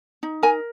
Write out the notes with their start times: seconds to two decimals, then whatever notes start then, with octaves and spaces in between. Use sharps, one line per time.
0.23 D#4
0.43 A#4 G#5